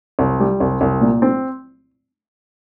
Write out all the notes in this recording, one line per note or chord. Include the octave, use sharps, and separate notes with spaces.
C2
G3
C2
C2
A#2
C4